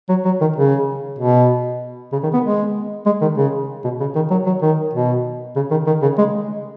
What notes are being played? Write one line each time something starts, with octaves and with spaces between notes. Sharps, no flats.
F#3
F#3
D#3
C#3
B2
C#3
D#3
B3
G#3
G#3
D#3
C#3
B2
C#3
D#3
F#3
F#3
D#3
B2
C#3
D#3
D#3
C#3
G#3